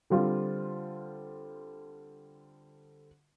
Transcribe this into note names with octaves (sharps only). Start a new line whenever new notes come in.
D3 G3 C4 F4